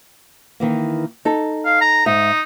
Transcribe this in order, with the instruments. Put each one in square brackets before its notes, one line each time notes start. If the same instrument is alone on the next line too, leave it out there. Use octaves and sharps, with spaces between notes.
[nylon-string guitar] D#3 E3 A#3
D#4 A4
[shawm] F5
A#5
[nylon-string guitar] G#2 E5 [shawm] D#4